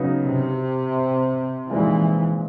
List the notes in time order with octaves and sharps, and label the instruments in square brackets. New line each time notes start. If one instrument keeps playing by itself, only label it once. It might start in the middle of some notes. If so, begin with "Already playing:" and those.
Already playing: [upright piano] C#3 F#3 B3 D#4
[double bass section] C3
[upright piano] A#2 F3 G#3 C4 D#4 [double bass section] E3